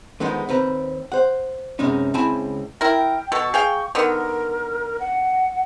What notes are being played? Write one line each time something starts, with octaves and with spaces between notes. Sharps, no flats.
D3 D#3 F3 G#3 B3 D#4
D#2 C4 B4 A#5
C5 F#5
F#2 C3 G#3 B3 C#4 D#4
C#2 C4 E4 G#5 A5 B5
E4 A#4 G5
B2 A4 C#6
G#4 F5 G5
D3 D#3 B3 A#4
F#5